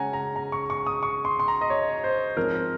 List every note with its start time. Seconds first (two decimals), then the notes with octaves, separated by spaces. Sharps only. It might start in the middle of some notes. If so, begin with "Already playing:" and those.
Already playing: C#3 G#3 C#4 F#5 G#5 A#5
0.13 A#5
0.36 A#5
0.52 C#6
0.70 C#6
0.87 D#6
1.03 C#6
1.25 C6
1.40 C6
1.48 A#5
1.61 D#5
1.70 C#5
2.04 C5
2.37 G#2 F3 C4 F4 A#4